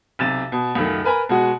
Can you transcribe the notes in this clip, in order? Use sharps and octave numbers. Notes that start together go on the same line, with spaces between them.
B1 C3 A6 E7
B2
C#2 F#2 D#3 A3
A#4 B4 G#5 A#5
B2 G#3 F#4